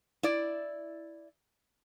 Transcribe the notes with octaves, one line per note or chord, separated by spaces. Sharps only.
E4 D5